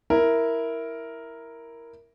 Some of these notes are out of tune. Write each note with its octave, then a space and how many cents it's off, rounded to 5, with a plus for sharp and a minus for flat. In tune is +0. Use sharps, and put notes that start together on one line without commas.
E4 +0 A#4 +0